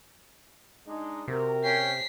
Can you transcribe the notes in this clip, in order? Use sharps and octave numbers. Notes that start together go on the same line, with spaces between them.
G#3 D4 D#4
C3 F#4 A#4
C#4 G5 B6 C7